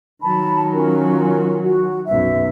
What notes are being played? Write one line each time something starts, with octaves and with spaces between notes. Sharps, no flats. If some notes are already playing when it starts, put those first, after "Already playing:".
D#3 F#3 A5 B5
C#4 F4 A#4
F#4
B1 F#2 E5